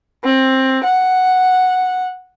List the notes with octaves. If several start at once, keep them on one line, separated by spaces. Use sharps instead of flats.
C4
F#5